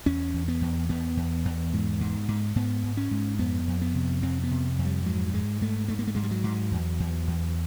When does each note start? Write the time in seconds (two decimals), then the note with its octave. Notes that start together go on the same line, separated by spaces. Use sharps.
0.06 E2 C#4
0.34 E2
0.48 B3
0.61 E2
0.89 E2 B3
1.17 E2
1.45 E2
1.73 G#2
2.01 G#2
2.28 G#2
2.56 G#2 B3
2.83 G#2
2.97 C#4
3.11 G#2
3.39 F2 B3
3.68 F2
3.82 B3
3.94 C3
4.23 F2 C4
4.44 B3
4.51 C3
4.79 F2
4.85 G3
5.06 G#2 F#3
5.33 G#2 G#3
5.61 G#2 A3
5.88 G#2 A3
5.99 A#3
6.07 A3
6.15 G#2 G#3
6.23 G3
6.31 F#3
6.44 G#2
6.71 E2
7.00 E2
7.28 E2